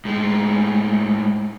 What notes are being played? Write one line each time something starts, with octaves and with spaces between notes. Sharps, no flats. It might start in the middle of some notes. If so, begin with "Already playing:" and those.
A2 G#3